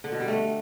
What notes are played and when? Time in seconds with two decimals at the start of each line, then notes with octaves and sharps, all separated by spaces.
0.04 D3
0.12 B2
0.20 G3
0.28 A3